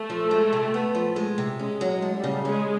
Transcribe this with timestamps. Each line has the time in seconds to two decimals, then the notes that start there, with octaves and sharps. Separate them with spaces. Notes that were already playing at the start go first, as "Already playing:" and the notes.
Already playing: A3
0.10 F3
0.31 G#3
0.53 C3
0.74 B3
0.95 F3
1.16 G#3
1.38 C3
1.59 G#3 C#4
1.81 F#3
1.87 G#3
2.02 A3
2.17 G3
2.24 C#3
2.45 G#3 C#4